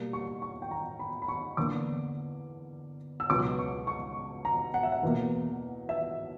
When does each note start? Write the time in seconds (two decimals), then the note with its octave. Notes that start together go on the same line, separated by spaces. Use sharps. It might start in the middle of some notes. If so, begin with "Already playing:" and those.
Already playing: B2 G3 A#3
0.13 C#6
0.42 C#6
0.62 G5
0.71 A#5
1.00 B5
1.22 B5
1.28 C#6
1.57 E2 D3 A#3 D6
3.20 E6
3.30 C#2 B2 F#3 B3 D6
3.59 C#6
3.87 C#6
4.45 A#5
4.74 F#5
4.83 E5
4.92 F#5
5.03 E2 B2 A#3
5.89 E5